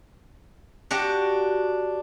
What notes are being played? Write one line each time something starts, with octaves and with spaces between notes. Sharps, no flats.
D4 F#4 G4 F#5